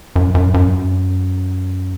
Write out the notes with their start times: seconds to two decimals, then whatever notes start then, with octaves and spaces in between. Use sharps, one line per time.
0.16 F#2
0.35 F#2
0.54 F#2